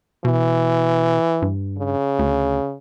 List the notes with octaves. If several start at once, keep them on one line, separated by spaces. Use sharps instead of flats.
B2 E3
G2
C#3
D2